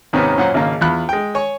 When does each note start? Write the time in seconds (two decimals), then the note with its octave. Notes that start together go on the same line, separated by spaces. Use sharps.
0.13 D#2 G#2 C3 D#3 B3 C#4
0.38 F#2 A#2 C#4 C5 F#5
0.54 G#1 C#3 A#3
0.81 E2 F4 B5 F#6
1.09 G#3 G5
1.35 C#5 G#5 C#6